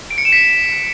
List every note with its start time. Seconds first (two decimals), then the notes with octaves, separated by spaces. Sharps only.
0.11 D7
0.18 C#7
0.25 E7
0.32 B6